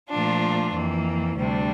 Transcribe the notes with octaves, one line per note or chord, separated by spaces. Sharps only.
A#2 F3 A3 D4 F4
F2 E3 A#3
D2 C3 G3 D4